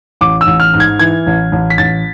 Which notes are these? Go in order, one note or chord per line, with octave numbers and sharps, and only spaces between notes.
A1 D6
E6
A1
F6
G#2
G#6
E3 G#6
A1
A1
B6
A1 A6